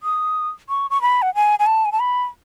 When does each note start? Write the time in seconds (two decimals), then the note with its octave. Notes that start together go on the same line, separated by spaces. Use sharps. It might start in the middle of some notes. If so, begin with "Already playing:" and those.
0.03 D#6
0.69 C#6
0.90 C#6
1.02 B5
1.22 F#5
1.35 G#5
1.59 G#5
1.67 A5
1.85 G#5
1.92 A5
2.00 B5